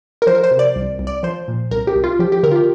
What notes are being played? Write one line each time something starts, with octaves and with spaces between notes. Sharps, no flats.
A#4
F3 C5
A#4
C5
C3
D5
C2
C2
D5
F3 C5
A#2
C2 A#4
G4
C2
F4
F3 G4
G4
D3 A#4
F4
G4